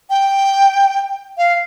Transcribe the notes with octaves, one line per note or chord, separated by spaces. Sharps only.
G5
F5